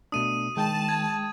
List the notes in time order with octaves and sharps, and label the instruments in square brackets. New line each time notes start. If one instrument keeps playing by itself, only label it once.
[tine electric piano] B2 A3 D4 [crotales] D#6 D#7
[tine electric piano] D#3 [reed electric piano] G#3 G5 [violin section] A5
[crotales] G#6